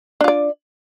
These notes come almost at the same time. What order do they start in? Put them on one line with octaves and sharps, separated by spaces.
D4 F4 D5